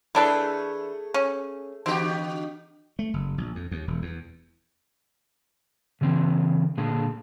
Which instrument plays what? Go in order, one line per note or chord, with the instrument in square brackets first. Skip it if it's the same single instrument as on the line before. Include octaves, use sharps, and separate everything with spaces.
[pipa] E3 D4 B4 [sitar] A3 G#4
[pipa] C#4
[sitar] D3 F#4 G4 [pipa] C4
[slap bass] A3
F#1
A#1
F2
D#2
E1
E2
[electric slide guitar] C#3 E3 C4
A#2 D3 A#3 G#4 A5